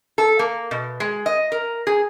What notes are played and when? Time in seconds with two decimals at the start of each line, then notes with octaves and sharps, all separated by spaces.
0.18 A4
0.39 A#3
0.71 B2
1.00 G#3
1.26 D#5
1.52 A#4
1.87 G#4